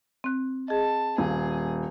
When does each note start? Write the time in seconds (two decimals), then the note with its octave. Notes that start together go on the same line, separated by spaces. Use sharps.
0.24 C4 F#6
0.68 G#4 D#5 A5
1.18 D#1 G#4 F5